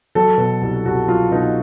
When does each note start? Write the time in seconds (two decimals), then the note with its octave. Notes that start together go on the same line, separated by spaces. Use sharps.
0.15 F#3 A4
0.38 B2
0.62 C2
0.85 C2 F#4
1.08 F#3 F4
1.31 B2 D#4